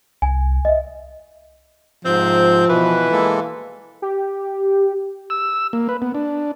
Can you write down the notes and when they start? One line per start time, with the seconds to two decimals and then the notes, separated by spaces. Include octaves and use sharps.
0.22 C2 G#5
0.65 D#5 E5
2.05 G#2 C3 F3 C4 G6
2.70 B2 E3 B4
3.11 G#3 A#3 A4
4.02 G4
5.30 E6
5.73 A#3
5.89 B4
6.02 B3
6.15 D4